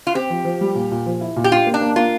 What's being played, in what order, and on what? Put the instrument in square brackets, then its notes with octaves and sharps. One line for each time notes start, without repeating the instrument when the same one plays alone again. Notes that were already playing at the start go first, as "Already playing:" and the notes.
[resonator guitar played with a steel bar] F4
[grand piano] C4 [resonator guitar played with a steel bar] G4
[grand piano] F3
F3
G3
A#2
A#2
F3
E4
A#2
[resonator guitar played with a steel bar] G4
[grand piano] D4 [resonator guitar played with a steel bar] F4
[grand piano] A#3
[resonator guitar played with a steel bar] D4
[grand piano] A#3
[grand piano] A#3 [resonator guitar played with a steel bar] F4